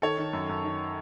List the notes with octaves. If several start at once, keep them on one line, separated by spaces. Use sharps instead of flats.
D#3 A4 C#5
D#3
F#2
F#2
D#3